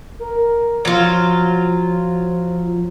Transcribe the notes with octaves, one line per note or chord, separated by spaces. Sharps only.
A#4
F3 F#3 F4